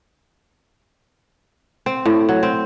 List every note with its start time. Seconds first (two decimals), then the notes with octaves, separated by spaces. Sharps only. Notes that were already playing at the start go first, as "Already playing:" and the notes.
1.86 C4
2.06 A2
2.29 F#3
2.43 C4